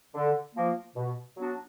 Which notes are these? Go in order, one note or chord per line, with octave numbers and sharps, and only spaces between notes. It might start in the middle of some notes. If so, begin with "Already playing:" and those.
D3
F3 A#3
B2
F#3 B3 D4 F#4